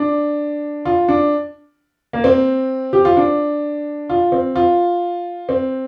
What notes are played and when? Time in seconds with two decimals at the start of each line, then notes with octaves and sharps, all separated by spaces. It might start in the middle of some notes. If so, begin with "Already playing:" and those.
Already playing: D4
0.85 F4
1.09 D4
2.13 A#3
2.24 C4
2.93 G4
3.05 F4
3.17 D4
4.10 F4
4.32 C4
4.56 F4
5.49 C4